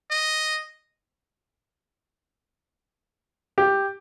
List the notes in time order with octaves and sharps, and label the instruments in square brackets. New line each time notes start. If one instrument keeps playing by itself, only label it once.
[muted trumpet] D#5
[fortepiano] G4